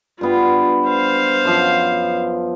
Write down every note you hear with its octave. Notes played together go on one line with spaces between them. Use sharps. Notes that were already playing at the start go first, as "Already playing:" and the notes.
G2 B3 F4 G5
C5 F5
F#2 F3